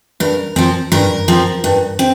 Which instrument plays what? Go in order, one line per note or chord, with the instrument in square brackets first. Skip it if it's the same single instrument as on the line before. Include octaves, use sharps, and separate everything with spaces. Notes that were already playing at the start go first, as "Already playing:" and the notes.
[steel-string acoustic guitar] G2 A#4
F3 C4
G2 A#4
F3 C4
G2
C4